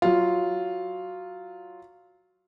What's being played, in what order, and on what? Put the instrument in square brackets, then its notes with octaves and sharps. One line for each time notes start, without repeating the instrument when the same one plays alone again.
[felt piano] F#3 F4